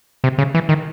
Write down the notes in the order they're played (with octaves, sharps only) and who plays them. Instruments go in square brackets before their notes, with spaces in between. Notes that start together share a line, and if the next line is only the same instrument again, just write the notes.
[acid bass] C3
C#3
E3
D#3